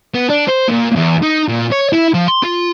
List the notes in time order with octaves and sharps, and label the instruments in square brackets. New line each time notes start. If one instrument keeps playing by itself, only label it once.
[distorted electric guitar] B3
D4
C5
A#2
E2
D#4
A#2
C#5
E4
F3
C6
F4